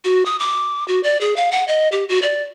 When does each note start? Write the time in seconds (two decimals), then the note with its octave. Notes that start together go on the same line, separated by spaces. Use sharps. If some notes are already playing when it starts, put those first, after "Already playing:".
0.05 F#4
0.26 D#6
0.40 D6
0.88 F#4
1.03 D5
1.21 G#4
1.36 F5
1.52 F#5
1.68 D#5
1.92 G4
2.09 F#4
2.22 D5